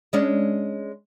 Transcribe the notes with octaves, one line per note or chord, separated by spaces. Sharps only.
G#3 C#4 D4